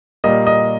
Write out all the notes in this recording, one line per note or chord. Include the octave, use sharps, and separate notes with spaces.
A#2 G3 A#3 D#5
D#5